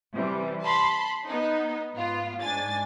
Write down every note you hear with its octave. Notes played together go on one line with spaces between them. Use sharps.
C3 E3 G3
A5 B5 C6
B3 D#4
G#2 B3 F4
G#2 D4 G#5 A6